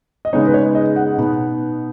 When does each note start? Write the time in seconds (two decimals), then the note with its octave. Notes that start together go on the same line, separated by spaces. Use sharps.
0.25 D#5
0.33 C#3 G#3 B3 D#4 C#5
0.47 B4
0.54 C#5
0.75 D#5
0.96 F#5
1.18 B2 B3 D#4